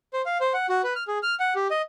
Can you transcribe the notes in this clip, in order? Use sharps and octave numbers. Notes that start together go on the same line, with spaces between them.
C5
F5
C5
F#5
F#4
B4
F6
G#4
F6
F#5
G4
D#5